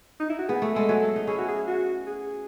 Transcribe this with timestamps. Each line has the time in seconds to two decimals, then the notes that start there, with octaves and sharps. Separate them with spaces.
0.20 D#4
0.29 E4
0.39 F#4
0.48 B3 G#4
0.62 A3
0.75 G#3 A4
0.89 F#3 A3
1.01 A4
1.16 D#4
1.27 C#4 E4 G#4
1.38 F#4
1.48 G#4
1.67 F#4
2.07 G#4